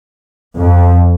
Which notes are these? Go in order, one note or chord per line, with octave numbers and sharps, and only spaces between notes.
F2